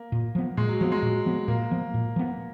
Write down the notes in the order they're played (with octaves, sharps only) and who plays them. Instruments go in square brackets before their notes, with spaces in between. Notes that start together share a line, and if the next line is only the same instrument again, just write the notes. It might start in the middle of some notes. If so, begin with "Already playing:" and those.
Already playing: [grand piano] A#3
[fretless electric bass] A#2
F3 B3
[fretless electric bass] A#2 [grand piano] G#3
[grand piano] F#3
[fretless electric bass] F3 B3 [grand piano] F#3
[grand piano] G#3
[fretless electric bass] A#2
F3 B3
[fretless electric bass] A#2 [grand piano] A#3
[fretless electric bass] F3 B3
A#2
F3 B3